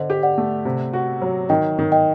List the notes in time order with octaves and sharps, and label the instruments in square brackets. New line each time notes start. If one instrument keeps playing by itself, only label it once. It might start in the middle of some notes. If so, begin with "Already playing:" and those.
Already playing: [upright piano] D3 [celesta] C5 D#5
[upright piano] G4
[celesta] D5 F#5
[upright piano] A3
C3
F#4
F#3
[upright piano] D#3 [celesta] D#5 G5
[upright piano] D#3
[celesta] D#5 G5